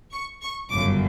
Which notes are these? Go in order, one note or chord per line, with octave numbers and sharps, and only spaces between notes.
C#6
C#6
G1 F#2 C#3 D6